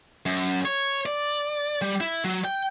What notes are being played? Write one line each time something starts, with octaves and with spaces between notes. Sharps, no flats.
F#2
C#5
D5
G3
E4
F#3
G5